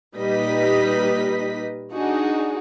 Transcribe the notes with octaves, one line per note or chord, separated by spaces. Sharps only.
A#2 G3 D#4 B4 D#5 B6
D4 D#4 F#4 G#4